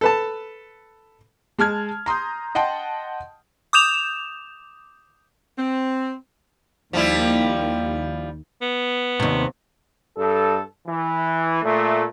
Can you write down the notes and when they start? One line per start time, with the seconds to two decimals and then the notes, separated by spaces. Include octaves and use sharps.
0.01 A4 B4 A5
1.59 G#3 A5 F6 G#6
2.06 A#5 C6 D#6 G6
2.55 D#5 F#5 G5 A5 C6
3.73 D6 D#6 G6 E7 F7
5.58 C4
6.93 D#2 F3 G3 E4
8.62 B3
9.20 D#2 C3
10.17 G2 A4
10.87 E3
11.63 A#2 A3